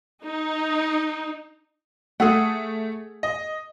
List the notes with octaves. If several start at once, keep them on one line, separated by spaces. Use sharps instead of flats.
D#4
A3 G#4 A4 F#5
D#5